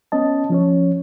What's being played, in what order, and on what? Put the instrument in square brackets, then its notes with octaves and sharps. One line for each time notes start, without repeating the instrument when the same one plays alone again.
[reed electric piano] B3 C#4 D#5 A5
F3 C#4 C#5